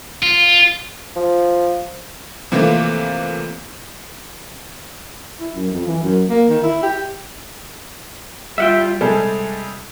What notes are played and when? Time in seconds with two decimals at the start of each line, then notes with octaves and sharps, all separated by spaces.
0.22 F4
1.16 F3
2.52 C3 E3 F3 A3 A#3
5.40 E4
5.55 F#2
5.71 F2
5.87 E3
6.03 F#2
6.30 A#3
6.49 D#3
6.63 E4
6.83 G4
8.58 G3 F4 E5 F#5 G5
9.01 C3 G3 G#3 G#4 A4 E6